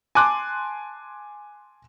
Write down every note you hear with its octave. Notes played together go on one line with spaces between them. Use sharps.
G#5 A5 C6 D6 F#6